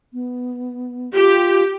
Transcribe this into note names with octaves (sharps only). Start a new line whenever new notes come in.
B3
F4 G4